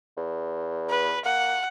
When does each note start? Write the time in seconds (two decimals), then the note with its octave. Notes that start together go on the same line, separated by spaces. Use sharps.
0.17 E2
0.90 B4
1.25 A#3 F#5